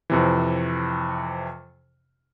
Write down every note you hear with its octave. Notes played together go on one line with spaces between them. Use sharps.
F2 C3 E3